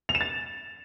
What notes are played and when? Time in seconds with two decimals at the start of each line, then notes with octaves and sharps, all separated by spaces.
0.09 F7
0.15 E7
0.21 A6